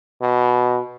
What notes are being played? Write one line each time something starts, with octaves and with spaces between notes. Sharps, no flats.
B2